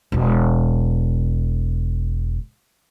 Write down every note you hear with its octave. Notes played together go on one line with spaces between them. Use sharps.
E1 B2